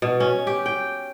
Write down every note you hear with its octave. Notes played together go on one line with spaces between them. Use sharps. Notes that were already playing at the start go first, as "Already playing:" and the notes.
B2
C#4
G4
G5